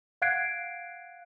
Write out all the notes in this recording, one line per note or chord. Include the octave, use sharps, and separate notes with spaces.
F5 F#5 F#6 G#6 C7 D7